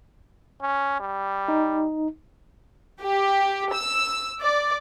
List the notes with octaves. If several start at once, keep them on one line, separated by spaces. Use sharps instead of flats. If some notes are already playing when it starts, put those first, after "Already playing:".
C#4
G3
D#4
G4
E6
D5